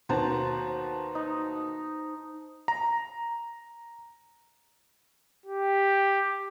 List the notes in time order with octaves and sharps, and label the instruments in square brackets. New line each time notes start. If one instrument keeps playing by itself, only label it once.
[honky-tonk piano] D#2 B2 [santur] C5 A5 A#5
[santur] D#4
[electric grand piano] A#5
[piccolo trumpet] G4